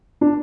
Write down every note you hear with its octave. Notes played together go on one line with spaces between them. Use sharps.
D4